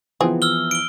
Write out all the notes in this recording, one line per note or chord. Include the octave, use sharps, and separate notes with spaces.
E3 F3 B3 C4 G#4
E6 F6 G7
D7 G7